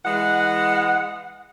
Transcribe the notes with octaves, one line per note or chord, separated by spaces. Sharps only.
E3 G#3 F#5